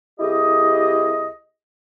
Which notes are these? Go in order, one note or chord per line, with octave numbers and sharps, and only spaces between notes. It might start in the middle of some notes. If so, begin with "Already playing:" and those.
C2 E4 G4 G#4 D#5